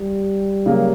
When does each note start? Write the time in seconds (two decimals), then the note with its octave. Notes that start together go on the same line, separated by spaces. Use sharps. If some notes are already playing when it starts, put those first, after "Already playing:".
Already playing: G3
0.66 C#3 F#3 A#3